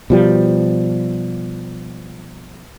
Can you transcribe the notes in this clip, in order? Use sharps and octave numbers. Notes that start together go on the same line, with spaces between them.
B2 F3 G3